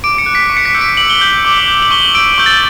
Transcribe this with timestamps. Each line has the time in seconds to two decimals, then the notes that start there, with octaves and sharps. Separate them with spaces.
0.04 D6 D7
0.18 C#7
0.26 F#6
0.35 B6
0.50 C#6
0.57 C#7
0.65 B6
0.74 E6 G6 C#7
0.81 D7
0.97 D6 F#7
1.10 G7
1.21 G6 F#7
1.45 D6
1.68 G6
1.82 F#7
1.91 C#6 G7
2.03 F#7
2.14 E6 G6 D7
2.38 C#6 G6
2.46 A6